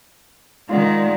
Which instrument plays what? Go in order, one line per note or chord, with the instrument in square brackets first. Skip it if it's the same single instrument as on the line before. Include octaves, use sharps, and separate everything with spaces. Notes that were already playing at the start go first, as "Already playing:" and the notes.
[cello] D#3 G#3 [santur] F4 D5 F#5